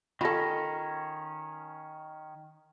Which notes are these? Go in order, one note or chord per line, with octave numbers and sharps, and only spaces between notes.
D#3 C#4 F4 A4 B5 A#6